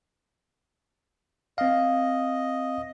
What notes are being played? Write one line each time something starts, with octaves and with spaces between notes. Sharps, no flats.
C4 D#5 F5